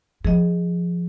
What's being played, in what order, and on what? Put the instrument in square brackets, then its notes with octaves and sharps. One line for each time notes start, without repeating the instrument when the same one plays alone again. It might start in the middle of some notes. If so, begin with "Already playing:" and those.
[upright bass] F3 [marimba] G#4 D#5